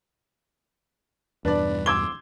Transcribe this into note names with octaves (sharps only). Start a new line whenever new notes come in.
E2 G2 B2 D4 B4 D5
C6 D6 E6 G#6 G7